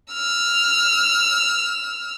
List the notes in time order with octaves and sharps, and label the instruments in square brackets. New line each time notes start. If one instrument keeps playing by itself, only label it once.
[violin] E6 F6